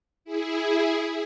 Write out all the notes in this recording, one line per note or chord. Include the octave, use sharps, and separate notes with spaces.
E4 G#4